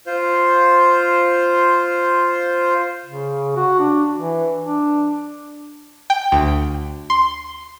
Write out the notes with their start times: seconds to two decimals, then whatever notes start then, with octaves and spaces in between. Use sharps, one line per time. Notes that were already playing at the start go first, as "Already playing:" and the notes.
0.07 F4 C5
3.05 C#3
3.56 F#4
3.79 D4
4.17 E3
4.61 D4
6.10 G5
6.32 D2
7.10 C6